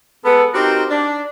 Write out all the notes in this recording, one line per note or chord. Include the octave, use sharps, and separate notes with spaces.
G#3 B3 A4
C4 D#4 F#4 G4 A#4 C5
D4